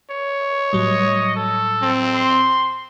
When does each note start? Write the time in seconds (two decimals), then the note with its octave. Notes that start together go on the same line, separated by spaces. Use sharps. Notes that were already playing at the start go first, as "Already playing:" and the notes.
0.11 C#5
0.73 A2 F#3 G3 D#5
1.36 A4
1.82 C4
2.16 C6